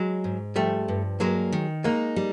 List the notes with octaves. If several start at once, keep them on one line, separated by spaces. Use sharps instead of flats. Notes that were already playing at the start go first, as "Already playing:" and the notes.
Already playing: F#3 G#3
G#2
F3 G3 A3
G2
F#3 G#3 A#3
D#3
G#3 A#3 D#4
G3